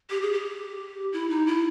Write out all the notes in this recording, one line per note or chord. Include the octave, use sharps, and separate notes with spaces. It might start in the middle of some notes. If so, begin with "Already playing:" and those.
G4
G#4
G4
E4
D#4
E4